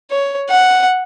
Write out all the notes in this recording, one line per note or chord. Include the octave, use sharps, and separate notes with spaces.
C#5
F#5